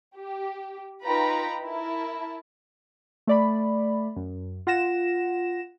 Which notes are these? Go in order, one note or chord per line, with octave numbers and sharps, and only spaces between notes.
G4
D#4 F4 B4 G5 A#5 B5
E4 A#4 A5
A3 D5 B5
F#2
F4 F#5 A#6 E7